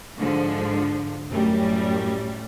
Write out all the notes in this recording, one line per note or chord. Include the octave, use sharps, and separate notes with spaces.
G#2 D3 F3
F#2 A2 G3